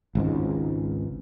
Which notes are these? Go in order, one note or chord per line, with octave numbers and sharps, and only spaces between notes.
G#1 C#2 G#2